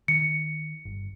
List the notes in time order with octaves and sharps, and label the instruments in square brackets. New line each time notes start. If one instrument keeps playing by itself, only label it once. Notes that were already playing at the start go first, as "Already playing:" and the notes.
[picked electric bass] D#3 [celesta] C#7
[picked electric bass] G1